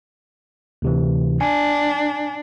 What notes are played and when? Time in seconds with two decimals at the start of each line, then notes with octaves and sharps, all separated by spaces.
0.82 D2 C3 E3
1.41 D4 G#5